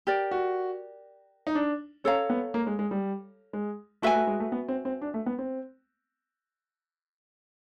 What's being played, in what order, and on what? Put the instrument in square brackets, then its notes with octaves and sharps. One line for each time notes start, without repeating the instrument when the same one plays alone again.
[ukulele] G4 A#4 D5
[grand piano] F#4
D#4
D4
[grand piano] C#4 [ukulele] A4 C#5 F5 A#5
[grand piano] B3
A#3
G#3
G#3
G3
G#3
[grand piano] A3 [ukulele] F#4 B4 E5 G#5
[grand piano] A3
G#3
A3
B3
C4
C4
D4
A3
B3
C4